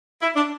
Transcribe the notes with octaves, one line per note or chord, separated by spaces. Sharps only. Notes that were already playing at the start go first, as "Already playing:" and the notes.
E4
D4